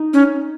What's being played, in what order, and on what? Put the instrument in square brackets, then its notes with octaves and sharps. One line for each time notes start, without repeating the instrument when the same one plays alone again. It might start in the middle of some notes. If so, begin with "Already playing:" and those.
Already playing: [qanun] D#4
[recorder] C#4